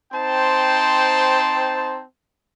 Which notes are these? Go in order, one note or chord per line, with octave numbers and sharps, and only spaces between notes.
C4 D#4 C5 G5 A5